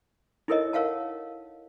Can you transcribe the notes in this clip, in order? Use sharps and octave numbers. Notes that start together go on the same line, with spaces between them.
D#4 E4 A4 A#4 C#5 D#5
A#4 C#5 F5 F#5 A5